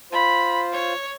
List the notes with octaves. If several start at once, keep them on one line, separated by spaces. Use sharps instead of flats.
F4 C5 B5
C#5